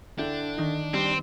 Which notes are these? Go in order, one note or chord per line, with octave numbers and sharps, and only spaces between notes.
D3 D4 E4 G5
D#3 D#4
G3 C4